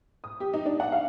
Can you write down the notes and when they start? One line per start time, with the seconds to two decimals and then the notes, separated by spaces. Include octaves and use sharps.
0.24 D#6
0.40 G4
0.54 D#4
0.65 D4
0.80 F#5
0.92 F5